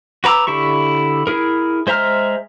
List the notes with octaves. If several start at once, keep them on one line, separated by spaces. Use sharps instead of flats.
F#4 B4 A#5 D6 E6
D3 E4 G4 C#6
E4 G#4 A#4
G#3 C5 E5 A#5 F6